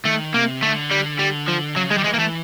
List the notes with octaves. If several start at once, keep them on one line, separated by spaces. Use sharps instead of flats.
D#3 A3
C3 A#3
D3 A3
G3
G3
F3
C#3 F#3
D#3 G#3
G3
E3 G#3
A#3
E3 A3